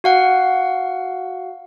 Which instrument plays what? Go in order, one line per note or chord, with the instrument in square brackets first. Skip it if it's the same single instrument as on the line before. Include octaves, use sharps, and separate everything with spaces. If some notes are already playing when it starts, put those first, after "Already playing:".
[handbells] F#4 F5 F#5